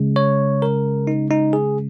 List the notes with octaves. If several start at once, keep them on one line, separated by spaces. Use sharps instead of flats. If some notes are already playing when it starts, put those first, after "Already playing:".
Already playing: C#3 G#3
C#5
A#4
D#4
D#4
G#4